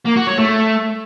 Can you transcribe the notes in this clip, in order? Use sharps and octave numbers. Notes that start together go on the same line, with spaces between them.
A#3
F#4
C#5
A3